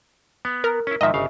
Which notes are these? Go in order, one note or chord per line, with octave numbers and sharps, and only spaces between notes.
B3
A#4
C#4 E4
G#2 D#3 F3 D#5 E5
G1 C#3 F5